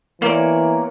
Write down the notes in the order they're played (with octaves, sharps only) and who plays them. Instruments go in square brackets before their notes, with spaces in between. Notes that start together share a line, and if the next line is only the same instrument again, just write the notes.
[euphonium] E3 [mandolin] A#3 D5 [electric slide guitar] B3 C#5